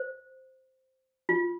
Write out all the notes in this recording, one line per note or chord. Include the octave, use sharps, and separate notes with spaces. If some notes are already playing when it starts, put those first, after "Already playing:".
Already playing: C5
F4